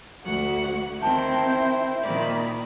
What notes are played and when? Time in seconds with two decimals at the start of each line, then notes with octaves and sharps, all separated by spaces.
0.25 D2 F#4 F#5
1.02 D#3 C4 E4 C5 G5 A5
2.03 A#2 D#3 D5 B5